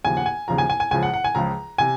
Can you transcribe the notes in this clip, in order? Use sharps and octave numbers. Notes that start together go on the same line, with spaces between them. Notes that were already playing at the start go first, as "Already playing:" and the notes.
D#2 C#3 F3 G#5
F#5
G#5
D#2 C#3 F3 A#5
G#5
G#5
G#5
C#2 C#3 F3 G#5
F#5
F#5
G#5
C#2 C#3 F3 A#5
C3 G#5